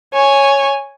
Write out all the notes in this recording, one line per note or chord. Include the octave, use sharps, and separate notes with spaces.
C#5 G#5